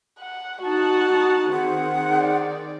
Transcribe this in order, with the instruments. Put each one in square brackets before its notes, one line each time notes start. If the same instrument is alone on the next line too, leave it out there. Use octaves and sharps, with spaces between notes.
[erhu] F#5
[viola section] D#4 F#5 A5 [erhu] F#4
[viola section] D#3 C4 G#4 [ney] F#5
[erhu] D5